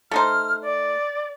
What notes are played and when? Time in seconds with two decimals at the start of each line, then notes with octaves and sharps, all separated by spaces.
0.11 A3 D#4 C5 F6
0.62 D5